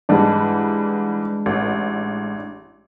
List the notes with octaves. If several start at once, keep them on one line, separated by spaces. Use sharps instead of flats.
G#2 E3 G3 G#3 D4
A1